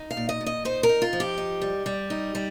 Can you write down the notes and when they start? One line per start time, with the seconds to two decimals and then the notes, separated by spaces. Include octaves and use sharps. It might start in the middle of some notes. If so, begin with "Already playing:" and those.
Already playing: D#4
0.11 F5
0.17 A#2
0.29 D#5
0.41 A#2
0.46 D#5
0.65 D#4 C5
0.83 A#4
0.89 D#4
1.02 F4
1.13 F3
1.20 G4
1.38 D#4
1.62 G3
1.86 G3
2.10 D#4
2.35 G3